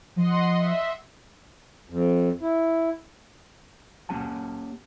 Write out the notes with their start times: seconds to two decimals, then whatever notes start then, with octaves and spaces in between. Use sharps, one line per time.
0.16 F3 D#5 F#5 C6
0.57 E5
1.90 F2
2.41 E4
4.09 A#3 C#4 G4 F#5 A5